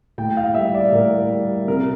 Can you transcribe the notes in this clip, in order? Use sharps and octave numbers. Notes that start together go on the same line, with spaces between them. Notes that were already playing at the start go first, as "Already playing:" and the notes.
A2 G5
F5
G3 E5
D5
A2 A#4
G3
C3 A#4